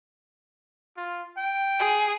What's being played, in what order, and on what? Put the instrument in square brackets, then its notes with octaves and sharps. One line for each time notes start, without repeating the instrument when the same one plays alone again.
[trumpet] F4
G5
[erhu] G#4